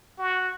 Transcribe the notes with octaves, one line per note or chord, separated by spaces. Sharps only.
F#4